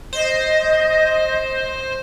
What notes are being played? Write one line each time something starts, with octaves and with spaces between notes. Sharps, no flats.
C5 D#5